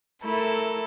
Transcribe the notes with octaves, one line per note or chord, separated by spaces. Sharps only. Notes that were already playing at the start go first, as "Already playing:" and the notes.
A3 E4 A4 A#4